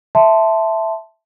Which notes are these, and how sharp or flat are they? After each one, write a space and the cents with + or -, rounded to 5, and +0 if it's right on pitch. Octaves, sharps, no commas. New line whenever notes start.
E5 +0 A5 +0 C6 -10